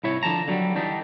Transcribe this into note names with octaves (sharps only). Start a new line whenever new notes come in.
C2 E4 C#5
D3 F3 A5 A#5
D3 F#3 G3
D3 E3 G3 D4 D#4